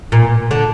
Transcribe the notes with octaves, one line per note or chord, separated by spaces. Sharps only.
A#2
D3